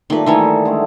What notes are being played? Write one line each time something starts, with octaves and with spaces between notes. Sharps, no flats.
A#2 D#3 G3 A3 B4
D#3 E3 D#4 E4 C#5 A5
D3 G#3 A3